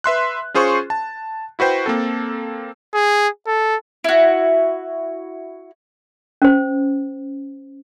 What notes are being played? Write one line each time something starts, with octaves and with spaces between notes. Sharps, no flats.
B4 E5 C6 F#6
C#4 F4 G#4 C5 C6 C#6
A5
E4 F#4 B4 C5 G5
A#3 C4 A4
G#4
A4
E4 F#4
C#4 C5